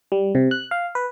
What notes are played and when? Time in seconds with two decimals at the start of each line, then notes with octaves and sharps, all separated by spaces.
0.12 G3
0.35 C3
0.51 F#6
0.71 F5
0.95 B4